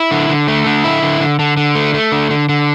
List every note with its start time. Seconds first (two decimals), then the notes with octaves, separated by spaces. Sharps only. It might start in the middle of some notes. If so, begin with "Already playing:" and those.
Already playing: E4
0.11 D3
0.29 D3
0.48 A3
0.66 D3
0.84 E4
1.02 D3
1.20 D3
1.39 D3
1.57 D3
1.75 A3
1.94 A3
2.12 D3
2.31 D3
2.49 D3